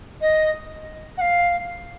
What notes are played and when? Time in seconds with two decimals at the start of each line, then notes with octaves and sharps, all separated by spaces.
0.21 D#5
1.18 F#5
1.21 F5